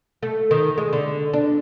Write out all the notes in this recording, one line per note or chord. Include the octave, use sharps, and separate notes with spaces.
A3
D#3
G#3
D3
D4